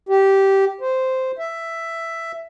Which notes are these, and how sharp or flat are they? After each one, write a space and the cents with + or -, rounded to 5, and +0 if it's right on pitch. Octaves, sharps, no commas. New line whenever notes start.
G4 -15
C5 -5
E5 +5